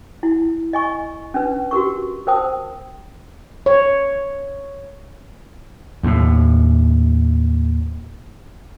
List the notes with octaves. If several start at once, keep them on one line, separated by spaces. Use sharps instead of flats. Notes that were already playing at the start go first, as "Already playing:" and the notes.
E4
D#5 G#5 C#6
C#4 D4 B4
F#4 G4 A#4 C#6
A#4 C5 G5 A5 D#6
C#5
D#2 A2